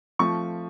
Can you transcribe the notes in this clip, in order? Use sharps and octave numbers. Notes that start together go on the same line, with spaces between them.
F3 A3 C4 F4 C#6